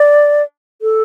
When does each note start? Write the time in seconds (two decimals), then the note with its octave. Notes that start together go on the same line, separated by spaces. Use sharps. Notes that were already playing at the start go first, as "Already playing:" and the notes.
Already playing: D5
0.82 A4